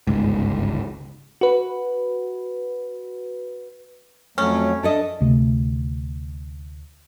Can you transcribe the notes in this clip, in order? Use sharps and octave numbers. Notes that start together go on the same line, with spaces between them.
G1 C#2 G#2
F#4 B4
F2 F#3 A3 C#4
D4 A4 D#5 E5 A5
D2 C3 A3